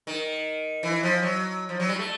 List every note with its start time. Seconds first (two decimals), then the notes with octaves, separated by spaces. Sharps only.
0.07 D#3
0.83 E3
1.03 F3
1.22 F#3
1.69 F3
1.80 F#3
1.89 G3
1.99 A3